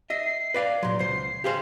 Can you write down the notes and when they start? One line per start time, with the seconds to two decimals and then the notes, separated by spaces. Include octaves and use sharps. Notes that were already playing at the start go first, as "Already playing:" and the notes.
0.10 D#5 E5 C7
0.54 B4 D5 F5
0.83 A#2 F#3 C6
0.99 C#2 C5 C7
1.44 G4 G#4 C5 F5